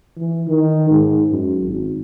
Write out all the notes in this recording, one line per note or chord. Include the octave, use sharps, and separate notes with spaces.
E3
D#3
G#2
F#2
G#1